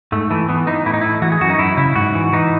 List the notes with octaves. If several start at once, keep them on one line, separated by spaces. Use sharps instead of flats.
G#2 A3
E3 A3
E3 B3
E3 D#4
A2 E4
D#4
A2 E4
E3 F#4
G#4
F#2 F#4
D#4
F#2 E4
C#3 E4
G#2 F#4
E3
E3 D#4